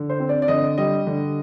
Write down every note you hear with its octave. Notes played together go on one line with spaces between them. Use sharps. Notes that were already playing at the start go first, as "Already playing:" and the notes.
Already playing: D3
C5
C4
D5
D5
D3 D#5
G3 D#5
D3